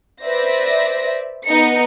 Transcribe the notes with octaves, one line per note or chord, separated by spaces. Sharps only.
B4 C5 D5 E5 A#6
B3 D#4 A#5 C#7